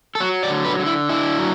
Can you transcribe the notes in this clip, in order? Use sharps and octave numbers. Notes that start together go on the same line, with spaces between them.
A4
F#3 F#4
D5
D3
B4
D3
E4
D4 E4
F#3